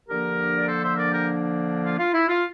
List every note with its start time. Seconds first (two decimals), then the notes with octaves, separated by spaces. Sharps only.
0.09 D3 F3 A#3 D4 G4 A#4
0.56 D5
0.67 A4 C5
0.82 C5 E5
0.97 A#4 D5
1.12 G4 A#4
1.84 F4
1.99 F4
2.14 E4
2.28 F4